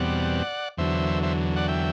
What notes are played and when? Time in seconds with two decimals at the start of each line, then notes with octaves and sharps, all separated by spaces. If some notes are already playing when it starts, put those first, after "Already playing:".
Already playing: E2 B2 G3 C4 D5 F#5
0.78 E2 D3 F#3 C5 E5
1.23 C5 E5
1.56 D5 F#5
1.68 E5 G5